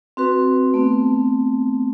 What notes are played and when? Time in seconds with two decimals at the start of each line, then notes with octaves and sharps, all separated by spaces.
0.17 C4 F#4 B4
0.74 A3 B3 C4